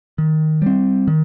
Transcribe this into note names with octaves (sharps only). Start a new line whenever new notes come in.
D#3
G3 C4
D#3